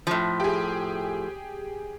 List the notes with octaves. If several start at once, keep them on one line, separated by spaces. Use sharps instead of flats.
A2 F3
G4 G#4